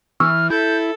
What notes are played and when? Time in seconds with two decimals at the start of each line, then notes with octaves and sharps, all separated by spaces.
0.20 E3 C#6 E6 F6
0.50 E4 A4 G6